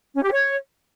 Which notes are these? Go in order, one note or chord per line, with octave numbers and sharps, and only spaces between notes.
C#4
G4
C#5